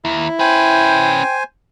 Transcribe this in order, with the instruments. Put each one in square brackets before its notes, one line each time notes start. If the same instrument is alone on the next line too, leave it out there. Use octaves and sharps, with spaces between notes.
[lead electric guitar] D#2 [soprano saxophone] E4
[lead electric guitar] C#4 B4 [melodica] C5 G#5 [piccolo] G5